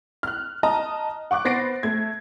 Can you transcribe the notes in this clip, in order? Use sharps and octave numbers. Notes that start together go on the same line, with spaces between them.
F6 F#6
D#5 A5 A#5
F#5 C#6 D6 F#6
B3 C5 A6 A#6 C7 D7
A3 G#6